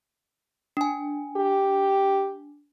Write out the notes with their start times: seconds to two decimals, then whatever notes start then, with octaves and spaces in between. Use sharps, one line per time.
0.77 D4 G#5
1.37 G4